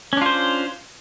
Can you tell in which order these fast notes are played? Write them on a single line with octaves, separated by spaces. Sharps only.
C#4 D4 F4 C5